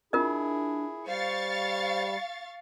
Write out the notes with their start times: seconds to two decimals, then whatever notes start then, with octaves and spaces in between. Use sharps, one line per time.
0.13 D4 E4 F4 G#4 A#4 D#5
1.07 G3 C5 F5 C#6 A6